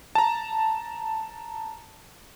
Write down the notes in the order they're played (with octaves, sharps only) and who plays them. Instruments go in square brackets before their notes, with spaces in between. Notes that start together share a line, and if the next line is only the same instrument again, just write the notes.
[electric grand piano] A5 A#5